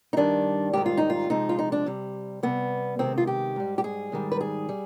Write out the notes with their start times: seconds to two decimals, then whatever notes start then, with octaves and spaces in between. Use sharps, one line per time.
0.13 D#4
0.17 G2 D#3 G3 D4
0.73 G#2 D#3 G3 G4
0.86 F4
0.97 D#4
1.10 F4
1.30 F2 C3 F3 G#3 D#4
1.49 F4
1.59 D#4
1.72 D4
1.86 C3 G3
2.43 C3 G3 B3
2.99 C3 D#3 G#3 C4
3.18 F4
3.27 G4
3.56 G#2 G3
3.78 G4
3.84 G#4
4.12 G#2 D#3 G3
4.32 B4
4.41 G#4
4.69 G3